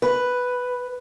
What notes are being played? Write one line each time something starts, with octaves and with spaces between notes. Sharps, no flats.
B4